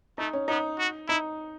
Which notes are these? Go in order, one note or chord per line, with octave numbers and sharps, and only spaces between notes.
A3 D#4
C#4
B3 D#4
F#4
D#4 E4